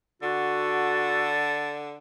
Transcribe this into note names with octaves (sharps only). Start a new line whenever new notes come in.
D3 F#4 A4